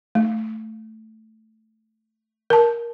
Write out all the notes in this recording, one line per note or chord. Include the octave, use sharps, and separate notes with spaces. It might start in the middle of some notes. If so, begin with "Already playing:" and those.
A3
A#4 A5